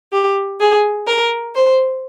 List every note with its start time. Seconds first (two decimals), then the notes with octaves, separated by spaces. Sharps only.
0.13 G4
0.60 G#4
1.07 A#4
1.54 C5